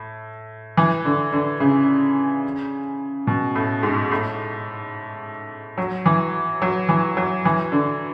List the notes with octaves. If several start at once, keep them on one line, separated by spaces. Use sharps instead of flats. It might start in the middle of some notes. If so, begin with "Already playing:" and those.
Already playing: A2
E3
D3
D3
C#3
B2
A2
G#2
A2
F#3
E3
F#3
E3
F#3
E3
D3